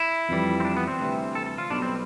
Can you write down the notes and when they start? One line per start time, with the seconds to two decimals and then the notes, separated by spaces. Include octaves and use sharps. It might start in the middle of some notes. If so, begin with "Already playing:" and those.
Already playing: E4
0.29 F2 E3 G3
0.60 C4
0.65 D4
0.77 B3
0.88 C4
1.00 D2 C3 E3 G3
1.35 A4
1.46 A4
1.58 F4
1.70 B1 B2 G3 D4
1.82 C4